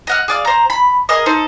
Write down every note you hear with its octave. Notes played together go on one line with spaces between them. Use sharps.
D#5 F#5 F6
G#4 D5 F5
C5 A#5
B5
G#4 A#4 D#5
D#4 A4 C5